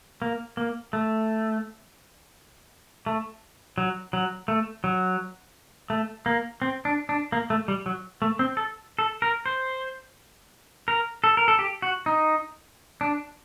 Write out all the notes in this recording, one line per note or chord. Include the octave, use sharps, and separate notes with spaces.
A#3
A#3
A3
A3
F#3
F#3
A3
F#3
A3
A#3
C4
D4
D4
A#3
A3
G3
F#3
A3
C4
A4
A4
A#4
C5
A#4
A4
A#4
A4
G4
F#4
D#4
D4